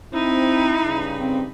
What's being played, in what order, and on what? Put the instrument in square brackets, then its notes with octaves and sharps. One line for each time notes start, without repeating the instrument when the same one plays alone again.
[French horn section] C4 [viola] D#4 B5 [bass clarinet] E4
[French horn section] G2 C#3
[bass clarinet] C4